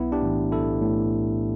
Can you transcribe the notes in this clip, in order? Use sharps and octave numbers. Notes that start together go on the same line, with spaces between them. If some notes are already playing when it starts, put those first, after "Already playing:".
Already playing: B1 B3 E4
D4 G4
A2 E3
B1 E4 A4
A2